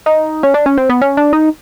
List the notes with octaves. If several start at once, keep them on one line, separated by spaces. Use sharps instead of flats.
D#4
C#4
D4
C#4
C4
B3
C#4
D4
D#4